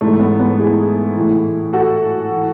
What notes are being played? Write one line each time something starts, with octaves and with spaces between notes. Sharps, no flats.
G#2 E3 A3
B3
B3
E4 G#4
A2 E3
F#4 A4
E3